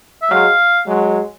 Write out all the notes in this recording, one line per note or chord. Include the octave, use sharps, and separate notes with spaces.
E5
F#3 G#3 F5
F#3 G#3